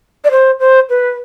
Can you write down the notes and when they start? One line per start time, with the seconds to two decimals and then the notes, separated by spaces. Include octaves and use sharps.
0.24 D5
0.31 C5
0.60 C5
0.90 B4